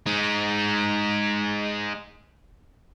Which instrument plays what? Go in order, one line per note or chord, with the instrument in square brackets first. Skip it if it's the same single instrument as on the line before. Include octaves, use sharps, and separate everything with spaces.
[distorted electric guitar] G#3 D#4